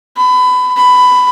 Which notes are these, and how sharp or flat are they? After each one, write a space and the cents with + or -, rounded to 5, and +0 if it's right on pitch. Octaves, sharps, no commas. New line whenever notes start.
B5 +25
B5 +15